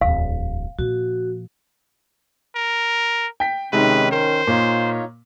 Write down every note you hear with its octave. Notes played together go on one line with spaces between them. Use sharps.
D1 E2 F5
A#2 F3 F#4
A#4
G5 B6
C3 D#3 G#3 C#4 D#4 B4
A#4 C5
A#2 D#4 F4 C#5